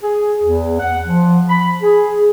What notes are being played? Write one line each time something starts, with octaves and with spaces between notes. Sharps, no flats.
G#4
E2
F#5
F3
B5
G#4